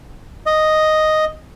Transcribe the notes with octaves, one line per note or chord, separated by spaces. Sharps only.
D#5